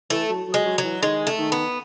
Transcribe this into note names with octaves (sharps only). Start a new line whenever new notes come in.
E3 A3
F#3
F#3
G#3
F#3
F#3
E3
D#3 G#3
A3
D#3
B3